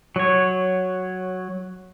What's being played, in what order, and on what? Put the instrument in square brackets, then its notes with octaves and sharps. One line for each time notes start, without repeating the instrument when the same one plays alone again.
[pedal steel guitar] F#3 C#5